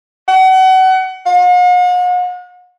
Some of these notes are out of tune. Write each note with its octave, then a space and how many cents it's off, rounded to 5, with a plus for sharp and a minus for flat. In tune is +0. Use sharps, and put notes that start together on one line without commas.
F#5 +30
F#5 -45